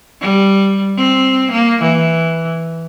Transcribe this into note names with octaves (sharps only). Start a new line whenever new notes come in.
G3
C4
A#3
E3